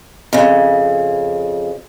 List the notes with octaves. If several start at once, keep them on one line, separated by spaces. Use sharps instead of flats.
F2 C#3